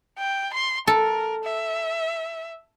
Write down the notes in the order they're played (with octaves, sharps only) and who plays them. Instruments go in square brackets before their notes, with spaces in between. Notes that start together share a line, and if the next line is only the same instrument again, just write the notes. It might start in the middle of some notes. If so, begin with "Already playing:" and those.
[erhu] G5
C6
[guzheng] A4 [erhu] A#4
[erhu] E5